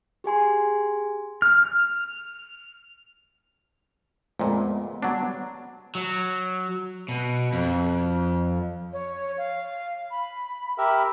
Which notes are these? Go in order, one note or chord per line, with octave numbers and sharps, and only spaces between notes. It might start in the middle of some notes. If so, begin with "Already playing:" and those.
G4 G#4 G#5 C6
F6
F2 A#2 G#3 A3 B3
F#3 G3 B3 D4
F#3
B2
F2
C#5
F5
B5
G4 A#4 E5 B5